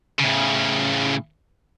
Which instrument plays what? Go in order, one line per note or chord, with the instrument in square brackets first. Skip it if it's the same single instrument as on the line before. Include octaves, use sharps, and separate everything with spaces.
[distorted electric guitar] A2 C#3